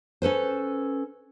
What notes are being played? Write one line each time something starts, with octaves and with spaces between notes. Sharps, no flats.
C#4 A4 B4 C5